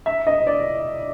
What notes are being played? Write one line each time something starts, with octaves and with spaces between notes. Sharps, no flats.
E5
D#5
D5